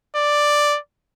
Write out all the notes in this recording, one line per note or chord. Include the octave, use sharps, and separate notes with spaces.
D5